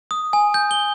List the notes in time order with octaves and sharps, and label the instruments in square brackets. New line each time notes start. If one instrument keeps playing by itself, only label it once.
[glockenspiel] D#6
G#5
G6
G7